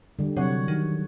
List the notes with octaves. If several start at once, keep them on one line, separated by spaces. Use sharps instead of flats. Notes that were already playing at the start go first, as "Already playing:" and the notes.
D3 G3
C3 F#3 C#5 F#5
D#3